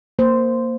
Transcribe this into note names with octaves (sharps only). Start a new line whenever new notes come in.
A#3 C5